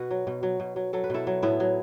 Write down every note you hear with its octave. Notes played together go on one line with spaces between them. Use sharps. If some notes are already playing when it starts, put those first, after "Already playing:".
Already playing: B2 F#4 B4
F#3
B2
F#3
B2
F#3
F#3 A4
B4
B2 E4 A4
F#3
A2 B3 E4
F#3